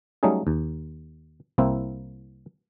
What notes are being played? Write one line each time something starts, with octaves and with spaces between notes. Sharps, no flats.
F#3 G3 A3 C#4 D#4 G#4
D#2
C2 A#3 C4 E4